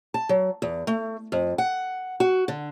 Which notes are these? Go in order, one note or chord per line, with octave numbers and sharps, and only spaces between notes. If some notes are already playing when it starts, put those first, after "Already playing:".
A5
F#3
E2
A3
F2
F#5
F#4
D3